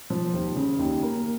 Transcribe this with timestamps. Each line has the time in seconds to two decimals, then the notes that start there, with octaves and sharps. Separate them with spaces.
0.10 F3
0.33 D#2
0.56 C#3
0.79 D#2
1.03 A#3